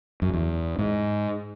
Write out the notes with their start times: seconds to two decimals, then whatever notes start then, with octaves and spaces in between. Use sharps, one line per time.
0.22 F#2
0.33 E2
0.78 G#2